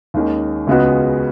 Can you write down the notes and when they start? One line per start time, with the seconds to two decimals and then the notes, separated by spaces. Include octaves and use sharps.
0.14 D#2 D#3 G#3 C#4
0.67 C#2 C#3 G#3 B3 F#4